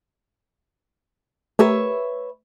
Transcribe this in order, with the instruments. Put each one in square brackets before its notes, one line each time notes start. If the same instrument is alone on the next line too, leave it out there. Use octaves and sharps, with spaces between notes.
[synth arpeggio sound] A3 G4 A#4 [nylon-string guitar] B4 C#5 E5